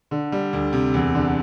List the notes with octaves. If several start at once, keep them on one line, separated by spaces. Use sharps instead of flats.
D3
G3
D2
C3
E2
D3